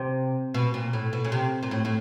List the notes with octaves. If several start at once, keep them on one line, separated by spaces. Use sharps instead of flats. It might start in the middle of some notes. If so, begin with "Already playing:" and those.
Already playing: C3
B2
A#2
A2
B2
C#3
C3
A#2
A2
A2